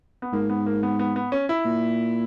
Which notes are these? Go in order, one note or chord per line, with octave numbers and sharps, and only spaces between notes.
B3
G#2 A#3
B3
A#3
B3
B3
B3
C#4
E4
A#2